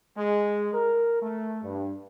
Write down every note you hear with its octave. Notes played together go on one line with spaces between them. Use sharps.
G#3
A#4
A3
G2